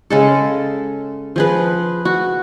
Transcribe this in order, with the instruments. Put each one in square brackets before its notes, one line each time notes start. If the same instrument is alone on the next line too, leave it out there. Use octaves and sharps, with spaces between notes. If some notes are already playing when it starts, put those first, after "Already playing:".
[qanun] C#3 G#3 A4
F3 G#4 B4
F#4